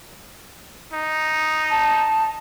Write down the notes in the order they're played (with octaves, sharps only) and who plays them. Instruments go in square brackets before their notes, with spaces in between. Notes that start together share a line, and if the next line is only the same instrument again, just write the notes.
[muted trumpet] D#4
[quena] A5